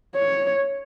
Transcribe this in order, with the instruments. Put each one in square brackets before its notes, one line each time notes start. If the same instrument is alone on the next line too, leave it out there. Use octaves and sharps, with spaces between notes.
[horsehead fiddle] C#5